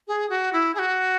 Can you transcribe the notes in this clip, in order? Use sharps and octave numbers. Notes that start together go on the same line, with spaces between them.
G#4
F#4
E4
G#4
F#4